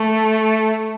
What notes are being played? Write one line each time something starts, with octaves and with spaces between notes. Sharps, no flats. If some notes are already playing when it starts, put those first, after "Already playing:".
Already playing: A3